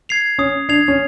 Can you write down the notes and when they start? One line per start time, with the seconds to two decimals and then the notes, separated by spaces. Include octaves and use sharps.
0.09 G#6 C7 F7
0.38 C#4 D#6
0.69 D4 G#6 C7 F7
0.88 C#4